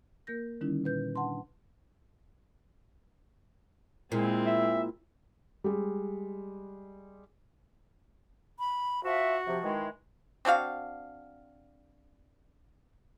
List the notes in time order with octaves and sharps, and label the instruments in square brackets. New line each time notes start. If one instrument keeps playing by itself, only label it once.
[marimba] A#3 A#4 G6 A#6
D3 D#3 G3 C#4 D#4 E4
A#2 B4 G6
D4 F#5 A5 C6
[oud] A#2 [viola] G#3 C4 [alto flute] E4
[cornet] E5
[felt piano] G3 G#3
[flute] B5
[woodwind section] F3 F4 E5 [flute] F#4
[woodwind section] C3 F3
D#3 E3 G#3
[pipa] C4 D4 F#4 F5